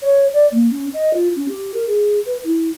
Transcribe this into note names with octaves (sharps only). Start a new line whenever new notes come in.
C#5
D5
A#3
C#4
D#5
F4
C#4
G4
A#4
G#4
B4
E4